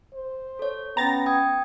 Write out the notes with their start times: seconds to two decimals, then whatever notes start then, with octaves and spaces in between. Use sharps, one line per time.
0.13 C5
0.59 A4 C#5
0.97 B3 C#4 G5 A#5 A6 A#6
1.26 G5 D#6 G#6